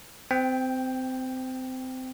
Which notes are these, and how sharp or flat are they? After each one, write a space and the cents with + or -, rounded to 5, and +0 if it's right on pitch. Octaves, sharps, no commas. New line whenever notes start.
C4 -25 G5 +5